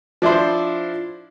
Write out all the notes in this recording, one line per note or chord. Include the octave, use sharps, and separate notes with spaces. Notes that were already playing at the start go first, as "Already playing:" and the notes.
F3 D4 E4 C5